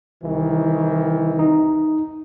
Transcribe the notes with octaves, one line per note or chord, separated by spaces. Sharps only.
C2 D#3 E3
D#4